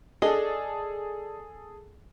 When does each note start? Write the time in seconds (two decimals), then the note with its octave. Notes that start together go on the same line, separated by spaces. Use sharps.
0.22 D4 G#4 A4 D#5